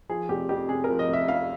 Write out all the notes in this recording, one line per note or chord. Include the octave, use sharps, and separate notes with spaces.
F3 G#4
F1 G4
F2 G4
C3 G#4
F3 A#4
D#5
F1 E5
F2 F5